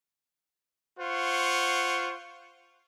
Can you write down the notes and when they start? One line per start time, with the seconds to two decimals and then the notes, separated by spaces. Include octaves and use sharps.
0.99 F4 C5 F#5 C#6